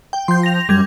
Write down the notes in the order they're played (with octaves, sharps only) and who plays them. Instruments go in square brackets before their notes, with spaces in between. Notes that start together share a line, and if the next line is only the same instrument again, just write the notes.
[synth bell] G5
[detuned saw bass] F3 [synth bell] C6 G6
[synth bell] A#6 F7
[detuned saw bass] F#2 [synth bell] G3 G#6